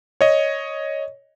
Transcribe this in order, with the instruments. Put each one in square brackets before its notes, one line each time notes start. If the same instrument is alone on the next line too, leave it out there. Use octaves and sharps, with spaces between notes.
[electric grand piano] C#5 D#5